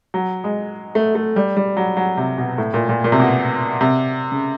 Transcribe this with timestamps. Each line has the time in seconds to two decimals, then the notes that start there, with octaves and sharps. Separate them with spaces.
0.14 F#3
0.44 G#3
0.95 A3
1.15 A3
1.36 G3
1.57 G3
1.77 F#3
1.97 F#3
2.17 C3
2.38 B2
2.58 A2
2.74 A#2
2.89 A#2
3.04 A#2
3.12 C3
3.20 B2
3.81 C3
4.32 C#3